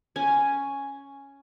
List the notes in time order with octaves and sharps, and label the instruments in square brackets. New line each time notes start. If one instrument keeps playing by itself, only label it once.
[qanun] C#4 G#5